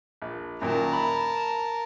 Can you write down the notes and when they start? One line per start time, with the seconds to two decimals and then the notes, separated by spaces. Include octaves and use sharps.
0.22 A#1
0.62 F#2 A#2 D#3 A#4 A5
0.93 B5